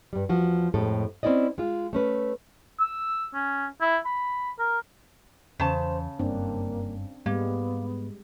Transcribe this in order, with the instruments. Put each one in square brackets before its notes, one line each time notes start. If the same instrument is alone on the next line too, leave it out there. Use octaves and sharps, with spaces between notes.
[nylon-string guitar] G2 G3
E2 F3 F#4
F2 A2 G#3 G4 A4
C4 C#4 E4 D5 D#5
G#3 F4
A3 C#4 B4
[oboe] E6
C#4
E4
B5
A#4
[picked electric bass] E2 E3 [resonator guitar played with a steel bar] C#3 A5 [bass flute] C5
[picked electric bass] F#1 G2 [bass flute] A#3 [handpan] C4 D4
[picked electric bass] G#2 [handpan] G3 G#3 [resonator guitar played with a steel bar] A#3 [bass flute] B3